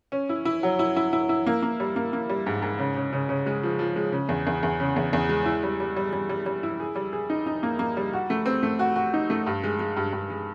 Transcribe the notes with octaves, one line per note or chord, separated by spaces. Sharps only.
C#4
E4
E4
F#3
E4
E4
E4
E4
A#3
A#3
G3
A#3
A#3
G3
G#2
G#2
C#3
C#3
C#3
C#3
G#3
F3
F3
G#3
C#3
E2
E2
E2
C#3
E2
E2
G#3
E4
G3
G3
G3
G3
G3
G3
E4
G#4
G3
G#4
D#4
D#4
A#3
A#3
G3
F#4
A3
C4
A3
F#4
F#4
D#4
A3
G2
G#3
G#3
G2
G2
G#3